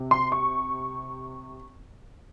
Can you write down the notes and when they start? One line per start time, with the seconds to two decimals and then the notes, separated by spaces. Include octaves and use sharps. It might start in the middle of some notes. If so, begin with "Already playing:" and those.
Already playing: C3
0.11 C6
0.32 C#6